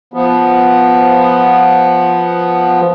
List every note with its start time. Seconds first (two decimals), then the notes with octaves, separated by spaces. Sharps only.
0.14 F3 B3